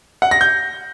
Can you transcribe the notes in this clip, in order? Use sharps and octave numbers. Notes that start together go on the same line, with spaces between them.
F#5
A#6
G6